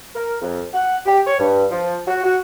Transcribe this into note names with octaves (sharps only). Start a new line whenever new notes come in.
A#4
F2
F#5
G4
C#5
G2
F3
F#4
F#4